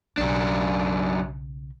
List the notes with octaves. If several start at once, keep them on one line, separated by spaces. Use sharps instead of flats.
B1 F#2 C#3 D4